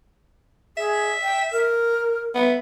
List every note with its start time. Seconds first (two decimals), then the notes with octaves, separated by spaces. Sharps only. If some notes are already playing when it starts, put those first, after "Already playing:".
0.77 G#4 E5
1.23 G5
1.52 A#4
2.35 B3 E5